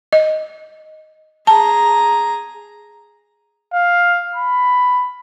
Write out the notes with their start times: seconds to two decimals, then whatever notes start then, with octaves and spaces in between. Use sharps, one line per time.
0.13 D#5
1.47 G#4 A5 A#5
3.73 F5
4.36 B5